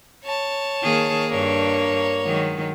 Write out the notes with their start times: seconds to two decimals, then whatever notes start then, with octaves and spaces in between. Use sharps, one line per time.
0.24 C#5 A5
0.83 D#3 A#3 G#4
1.30 G2 A#3 D4 C#5
2.24 D#3 F#3 G#3